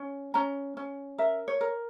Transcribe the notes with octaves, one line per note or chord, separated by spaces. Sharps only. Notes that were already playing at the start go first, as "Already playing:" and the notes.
Already playing: C#4
C#4 A#5
C#4
A#4 E5
C#5
A#4